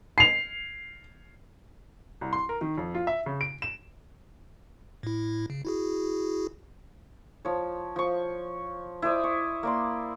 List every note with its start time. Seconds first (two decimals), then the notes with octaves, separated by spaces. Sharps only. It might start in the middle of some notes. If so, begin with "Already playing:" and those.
0.18 C7 F7
2.21 C2
2.33 C6
2.49 A#4
2.61 D#3
2.78 F2
2.95 F4
3.07 E5
3.26 C#3
3.41 D7
3.62 E7
5.03 A2 E4
5.50 C#3
5.65 E4 F#4 G#4
7.45 F3 C#5
7.96 F3 C#6
9.02 E4 C5 D5 D#5
9.24 C#6
9.63 A#3 D5 C6